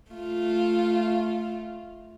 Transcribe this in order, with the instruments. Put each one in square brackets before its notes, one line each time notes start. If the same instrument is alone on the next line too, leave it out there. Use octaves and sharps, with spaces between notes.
[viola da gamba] A3 F4